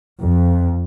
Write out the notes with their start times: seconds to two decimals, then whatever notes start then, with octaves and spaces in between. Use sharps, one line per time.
0.20 F2